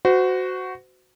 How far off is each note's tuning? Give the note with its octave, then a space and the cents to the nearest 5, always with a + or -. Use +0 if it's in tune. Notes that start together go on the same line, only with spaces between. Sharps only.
F#4 +0 C5 -30